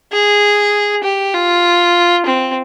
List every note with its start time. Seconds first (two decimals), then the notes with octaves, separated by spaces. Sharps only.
0.12 G#4
1.04 G4
1.34 F4
2.26 C4